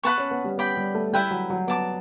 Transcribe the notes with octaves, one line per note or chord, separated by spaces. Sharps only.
B3 B4 F#5 A5 C#6
C#4
B3
G3
B3 D5 G5 B5
G3
A3
G3 E4 B4 E5 G5
F#3
F#3
B3 D5 A5 D6